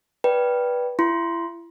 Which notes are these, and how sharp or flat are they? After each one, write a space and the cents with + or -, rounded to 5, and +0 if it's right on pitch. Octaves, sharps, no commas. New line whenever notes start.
B4 -15 D5 +0 G5 -10
E4 +35 C6 +0